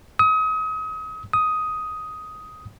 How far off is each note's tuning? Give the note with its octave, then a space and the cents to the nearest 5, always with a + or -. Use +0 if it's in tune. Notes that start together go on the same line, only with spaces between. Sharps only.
D#6 +35
D#6 +10